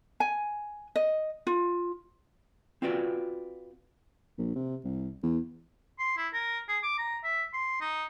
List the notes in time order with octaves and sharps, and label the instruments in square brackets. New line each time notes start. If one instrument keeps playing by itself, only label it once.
[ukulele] G#5
D#5
F4
[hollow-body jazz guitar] C4 F4 F#4 B4 D5
[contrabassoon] A#1
C3
C2
E2
[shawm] C6
E4
A#4
G#4
D6
A#5
E5
C6
D#4